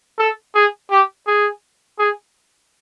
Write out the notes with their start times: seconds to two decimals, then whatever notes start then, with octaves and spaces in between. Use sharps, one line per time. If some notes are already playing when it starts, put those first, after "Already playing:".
0.18 A4
0.55 G#4
0.91 G4
1.27 G#4
1.99 G#4